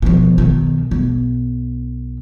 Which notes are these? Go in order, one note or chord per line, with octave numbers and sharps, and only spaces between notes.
B2 F3
B1 D#3
B1